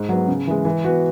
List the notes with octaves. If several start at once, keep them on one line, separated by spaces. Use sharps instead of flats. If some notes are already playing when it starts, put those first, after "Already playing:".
Already playing: G#2
F#3 B3
C#3
E3 G#3
E3
B3 F#4 B4